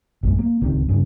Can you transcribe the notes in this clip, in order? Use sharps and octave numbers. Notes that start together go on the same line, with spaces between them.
A#1 F#2 G#3
A#3
D1 C#2 C3 D#3
G2 C#3